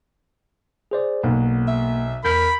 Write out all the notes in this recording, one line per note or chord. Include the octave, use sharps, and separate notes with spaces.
G#4 C5 D5
B1 A#3 F#5
E5
E2 A#4 B5 G6 B6